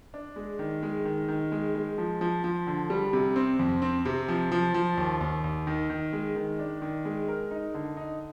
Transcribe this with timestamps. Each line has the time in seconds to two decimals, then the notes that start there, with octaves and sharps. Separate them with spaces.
0.14 D4
0.36 G#3
0.59 D#3
0.83 G#3
1.05 D#3
1.28 D#3
1.52 G#3
1.75 G#3
1.98 F3
2.21 F3
2.44 F3
2.67 D3
2.90 G3
3.13 C3
3.36 C4
3.59 F2
3.82 C4
4.05 C3
4.28 F3
4.52 F3
4.74 F3
4.97 D#2
5.21 D#2
5.44 D#2
5.67 D#3
5.90 D#3
6.13 G#3
6.36 D#3
6.59 D4
6.82 D#3
7.05 G#3
7.28 A#4
7.51 D#4
7.74 D3
7.97 D#4